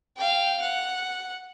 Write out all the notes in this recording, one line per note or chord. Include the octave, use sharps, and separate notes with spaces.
F5 G5
F#5